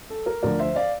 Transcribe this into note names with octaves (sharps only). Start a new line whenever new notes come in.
A4
A#4
D2 D3 F3 A#4 D5
C5 E5
D5 F5